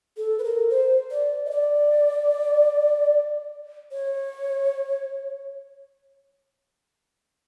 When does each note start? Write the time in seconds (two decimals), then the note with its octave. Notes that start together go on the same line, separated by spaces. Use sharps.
0.17 A4
0.39 B4
0.44 A#4
0.70 C5
1.11 D5
1.45 D#5
1.51 D5
3.92 C#5